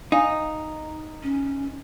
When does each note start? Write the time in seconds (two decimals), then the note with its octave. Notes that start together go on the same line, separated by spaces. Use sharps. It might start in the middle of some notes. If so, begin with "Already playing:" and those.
0.12 D#4 D#5 F5 G#5
1.23 C#4